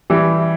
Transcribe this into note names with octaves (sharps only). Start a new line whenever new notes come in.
E3 G3